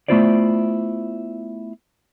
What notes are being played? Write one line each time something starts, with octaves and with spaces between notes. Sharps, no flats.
A3 B3 E4 F4 C5 D5